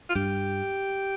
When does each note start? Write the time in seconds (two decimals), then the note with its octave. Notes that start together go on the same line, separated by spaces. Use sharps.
0.09 F4
0.15 G2 G4